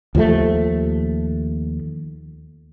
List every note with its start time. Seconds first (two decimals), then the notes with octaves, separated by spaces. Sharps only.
0.15 D#2 F3 F#3 A3